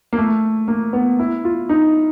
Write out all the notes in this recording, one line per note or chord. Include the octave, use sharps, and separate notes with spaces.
A#3
A3
A#3
B3
E4
F4
D#4